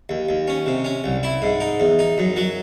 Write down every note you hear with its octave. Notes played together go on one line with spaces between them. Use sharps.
D#2
D#2
C#4
C3
C#4
C2
E4
G#2
D#4
E2
D#4
F#2
F#3